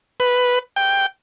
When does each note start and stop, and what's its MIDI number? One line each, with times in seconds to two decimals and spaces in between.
0.20 0.59 71
0.76 1.06 79